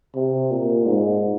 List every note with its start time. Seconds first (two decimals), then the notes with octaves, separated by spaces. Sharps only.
0.15 C3
0.51 A#2
0.86 G#2